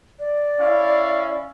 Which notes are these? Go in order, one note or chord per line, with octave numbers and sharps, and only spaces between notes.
D5
C#4 E4 F5